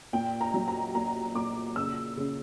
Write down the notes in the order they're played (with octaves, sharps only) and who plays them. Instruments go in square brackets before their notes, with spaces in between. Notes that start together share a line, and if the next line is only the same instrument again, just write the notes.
[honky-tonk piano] A#2 G5
A#5
F#3
A#5
A#2 A#5
A#2 D6
C#3 E6
C#3